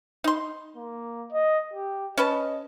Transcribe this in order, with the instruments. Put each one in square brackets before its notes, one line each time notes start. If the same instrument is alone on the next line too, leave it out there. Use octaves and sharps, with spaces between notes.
[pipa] D#4 C6
[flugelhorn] A#3
D#5
G4
[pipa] C#4 B4 A5 [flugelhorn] D#5